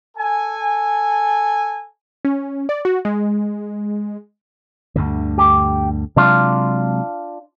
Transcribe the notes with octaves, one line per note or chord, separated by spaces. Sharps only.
A4 G#5
C#4
D5
F#4
G#3
D2 G2 D3
G4
C3 F#3 G#3 D4 F4